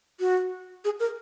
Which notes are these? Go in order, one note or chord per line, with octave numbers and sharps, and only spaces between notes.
F#4
G#4
A#4